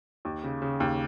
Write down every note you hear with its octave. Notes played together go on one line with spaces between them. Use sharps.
D#2
C#3
C#3
D#2